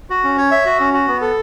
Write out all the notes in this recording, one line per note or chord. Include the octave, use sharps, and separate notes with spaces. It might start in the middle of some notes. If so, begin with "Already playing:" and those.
F#4
C#4
C#5
E5
F#4
C#4
F#4
B3
A4